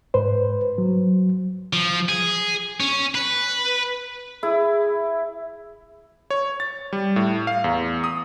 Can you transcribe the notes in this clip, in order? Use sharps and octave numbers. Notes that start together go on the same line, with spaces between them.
G#2 B4 C5
F#3
F3
G#4
C#4
B4
E4 G#4
C#5
A6
G3
A2
F5
E2
D#6